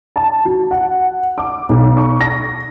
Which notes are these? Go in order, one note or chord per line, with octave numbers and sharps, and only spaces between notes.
A5
F#4
F#5
D6
B1
C#6
A#6